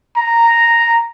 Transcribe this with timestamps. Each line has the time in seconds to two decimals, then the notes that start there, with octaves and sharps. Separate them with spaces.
0.17 A#5